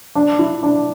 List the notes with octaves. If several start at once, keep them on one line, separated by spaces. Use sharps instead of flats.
D4
E4
D4